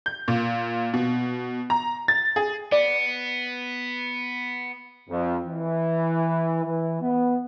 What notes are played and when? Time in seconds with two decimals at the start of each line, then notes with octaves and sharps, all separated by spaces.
0.06 G6
0.28 A#2
0.94 B2
1.70 A#5
2.08 A6
2.36 G#4
2.72 B3 D5
5.09 F2
5.46 E3
6.64 E3
7.02 B3